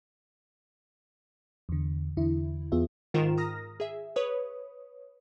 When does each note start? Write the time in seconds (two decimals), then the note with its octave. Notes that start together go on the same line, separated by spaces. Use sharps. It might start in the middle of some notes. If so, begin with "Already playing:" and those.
1.69 E2 D3
2.17 E2 D3 E4
2.72 E2 B3 F4 G#4 E5
3.14 G#2 D#3 F4 A#4 E7
3.38 A#5 D#6 F6 A#6
3.80 G#4 E5
4.16 B4 C#5 D#6